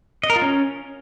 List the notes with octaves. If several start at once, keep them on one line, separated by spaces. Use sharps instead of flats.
D#5
A#4
F4
C#4